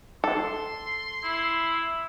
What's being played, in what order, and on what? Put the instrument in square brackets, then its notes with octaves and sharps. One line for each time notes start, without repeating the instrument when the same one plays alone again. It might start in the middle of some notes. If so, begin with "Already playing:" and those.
[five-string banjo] A4 [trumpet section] C6
[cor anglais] E4